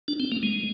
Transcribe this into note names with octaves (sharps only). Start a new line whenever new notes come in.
D4
C4
A#3
G#3